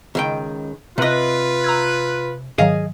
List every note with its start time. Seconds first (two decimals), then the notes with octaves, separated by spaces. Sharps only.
0.15 C#2 D#3 G5
0.98 C3 F4 B4 D#5
1.64 A#5 E6 G#6
2.58 G#2 D#3 F#3 G#4 D#5 F5